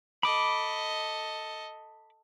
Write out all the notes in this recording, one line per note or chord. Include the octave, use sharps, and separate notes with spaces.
A4 D#5 B5 D6